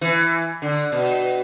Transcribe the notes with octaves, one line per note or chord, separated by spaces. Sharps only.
E3
D3
B2